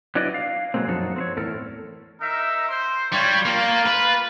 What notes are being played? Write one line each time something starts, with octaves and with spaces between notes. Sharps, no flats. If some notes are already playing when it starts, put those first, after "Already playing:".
F#3 D4 E4 B4 D5 D#5
F5
B2 F#3 G#3 A#3 C4
F#2 F3 D#4 F#4 A4
C4 C5 C#5
E2 A2 A4 A#4
D#4 A#4 E5
C5 C6
G3 F4 C#5
A#3 F4
B4